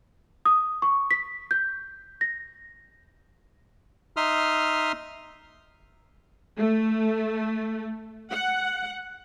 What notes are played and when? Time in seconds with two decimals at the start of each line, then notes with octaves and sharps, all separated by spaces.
0.45 D#6
0.82 C#6
1.11 B6
1.51 G6
2.21 A#6
4.17 D#4 E5 C6 D#6 F6
6.57 A3
8.31 F#5